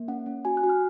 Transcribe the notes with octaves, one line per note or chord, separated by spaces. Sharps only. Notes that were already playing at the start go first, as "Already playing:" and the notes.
Already playing: A#3
C#4 F#5
C#4
F#4 G#5
F#6
F#4
F6